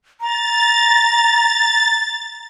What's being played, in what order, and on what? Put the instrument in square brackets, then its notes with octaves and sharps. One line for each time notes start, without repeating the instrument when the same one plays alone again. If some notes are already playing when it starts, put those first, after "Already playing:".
[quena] A#5 [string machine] A6